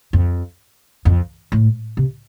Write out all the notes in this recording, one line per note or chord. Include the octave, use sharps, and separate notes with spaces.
F2
F2
A2
C3